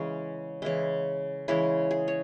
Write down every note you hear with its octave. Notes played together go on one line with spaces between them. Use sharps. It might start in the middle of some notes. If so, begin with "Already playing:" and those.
Already playing: C#3 E3 G#3 C#4
C#3 E3 G#3 E4
C#3 E3 G#3 E4
G#4
C#5